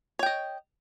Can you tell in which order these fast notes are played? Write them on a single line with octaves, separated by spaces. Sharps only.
C#5 G5 D#5